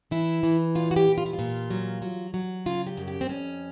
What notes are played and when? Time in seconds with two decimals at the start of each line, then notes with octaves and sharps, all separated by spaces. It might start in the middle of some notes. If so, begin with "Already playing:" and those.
0.11 E3 E4
0.43 E3
0.75 A#2 F4
0.91 F#4
0.96 G4
1.06 A#2
1.18 F4
1.26 E4
1.33 F4
1.39 A#2
1.70 F#3
2.02 F#3
2.34 F#3
2.66 C#3 F4
2.87 G4
2.97 F#2
3.08 G4
3.21 C4
3.29 F2 C#4